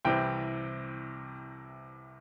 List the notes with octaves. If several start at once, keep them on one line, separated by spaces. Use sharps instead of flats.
C2 C3 E3 C4 G5